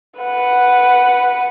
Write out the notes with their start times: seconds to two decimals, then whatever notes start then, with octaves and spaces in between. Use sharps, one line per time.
0.20 B4 F#5